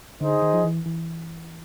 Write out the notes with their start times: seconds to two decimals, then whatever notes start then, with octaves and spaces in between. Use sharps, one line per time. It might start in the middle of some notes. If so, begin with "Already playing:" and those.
0.20 D3 D#4 G#4 C5 D#5
0.42 D#3
0.54 F3
0.64 E3
0.86 E3